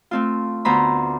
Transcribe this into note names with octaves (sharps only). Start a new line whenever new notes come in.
A3 C4 F4
D2 B3 C5 A#5 B5